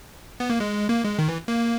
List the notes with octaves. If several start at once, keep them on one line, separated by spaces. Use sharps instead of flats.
B3
A#3
G#3
A#3
G#3
D#3
E3
A#3